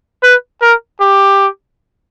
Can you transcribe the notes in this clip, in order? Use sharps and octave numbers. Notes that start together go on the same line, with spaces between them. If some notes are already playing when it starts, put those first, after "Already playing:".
B4
A#4
G4